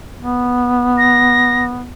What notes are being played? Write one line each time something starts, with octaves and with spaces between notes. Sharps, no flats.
B3
A#6